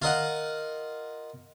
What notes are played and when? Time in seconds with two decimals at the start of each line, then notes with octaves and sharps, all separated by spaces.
0.02 F4 A#4 D#5 F#5